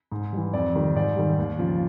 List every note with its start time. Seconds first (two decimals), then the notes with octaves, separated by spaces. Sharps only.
0.12 G#2
0.33 E3 G3
0.53 F2 D5
0.75 C3 D#3 G3
0.95 G#2 D5
1.16 D#3 G3
1.39 D#2
1.59 C#3 F3